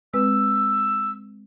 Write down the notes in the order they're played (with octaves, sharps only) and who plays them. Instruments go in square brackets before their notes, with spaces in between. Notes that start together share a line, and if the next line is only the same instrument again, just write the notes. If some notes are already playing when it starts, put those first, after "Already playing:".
[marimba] G#3 C4 B4 [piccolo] E6